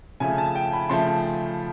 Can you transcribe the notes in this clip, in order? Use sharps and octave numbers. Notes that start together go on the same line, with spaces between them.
C#3 F3 A3 G#5
A5
G5
B5
C#3 F3 A3 C6